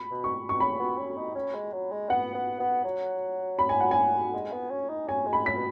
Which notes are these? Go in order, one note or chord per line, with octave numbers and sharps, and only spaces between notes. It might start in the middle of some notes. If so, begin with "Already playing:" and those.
Already playing: B5
B2
C#6
B2 C#6
C#3 B5
B3
C#4
D#4
C#4
G#3
F#3
G#3
B3 F#5
B3
B3
F#3
B5
G#5
F#5
G#5
G#3
B3
C#4
D#4
C#4 G#5
G#3
B5
F#3 B6
B2